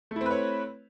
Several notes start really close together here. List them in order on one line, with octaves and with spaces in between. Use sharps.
A3 E4 C4 B4 C#5